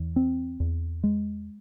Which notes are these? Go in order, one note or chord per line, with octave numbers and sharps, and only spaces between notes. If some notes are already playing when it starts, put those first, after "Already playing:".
Already playing: E2
C4
E2
G#3